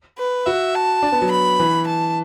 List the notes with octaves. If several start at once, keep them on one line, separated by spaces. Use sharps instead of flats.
B4
F#4 E5
A5
D4
B3
F#3
B5
E3
A5